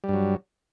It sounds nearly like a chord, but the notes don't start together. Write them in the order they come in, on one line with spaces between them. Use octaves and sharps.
G3 G2 F#3